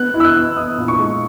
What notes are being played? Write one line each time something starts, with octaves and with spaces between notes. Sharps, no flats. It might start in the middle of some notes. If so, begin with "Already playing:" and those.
Already playing: B3 F#6
E4
E6
F#6
B3
B3 D#6
A#2
C#6
G#3